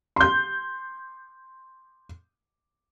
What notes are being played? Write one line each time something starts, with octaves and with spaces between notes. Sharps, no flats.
C6 G6